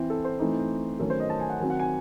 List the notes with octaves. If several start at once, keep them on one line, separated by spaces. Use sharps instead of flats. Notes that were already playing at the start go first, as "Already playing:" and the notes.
Already playing: E3 C4 E4
A4
C5
E3 A3 C4 D#4
D#3 F#3 A3 C#4 A4
C5
D#5
A5
G#5
F#5
D#3 F#3 C4 G#5
F#5
G#5